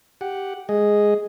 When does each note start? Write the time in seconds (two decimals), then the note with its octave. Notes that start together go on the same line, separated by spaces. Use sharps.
0.21 G4 F#5
0.69 G#3 G#4 D#5